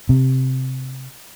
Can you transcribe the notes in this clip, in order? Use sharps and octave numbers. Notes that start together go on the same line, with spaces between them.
C3